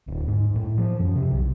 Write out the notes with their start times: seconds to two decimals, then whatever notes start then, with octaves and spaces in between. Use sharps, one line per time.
0.08 D1
0.28 G#2
0.56 A2
0.78 F3
1.00 F#2
1.16 C3
1.31 B1